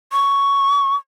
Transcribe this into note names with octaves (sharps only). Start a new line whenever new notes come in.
C#6